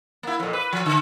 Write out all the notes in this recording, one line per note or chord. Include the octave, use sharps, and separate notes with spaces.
A#3 E4
F2 A#2
B4
F3
D3